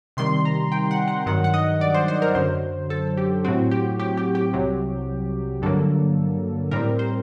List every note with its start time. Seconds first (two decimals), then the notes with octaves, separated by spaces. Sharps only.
0.17 C3 D#3 G3 C6
0.45 A#5
0.72 G5
0.91 F#5
1.08 F#5
1.26 G2 D#3 F#3 F#5
1.44 F#5
1.54 D#5
1.81 D5
1.94 C5
2.08 C5
2.22 A#4
2.35 F#2 D3 F#3 C5
2.90 A4
3.17 G4
3.44 A2 F#3 C4 F#4
3.71 G4
3.99 G4
4.17 G4
4.35 G4
4.53 C2 C3 F#3
5.62 G2 D3 F#3 A#3 A4
6.71 A2 G3 C4 A#4
6.99 C5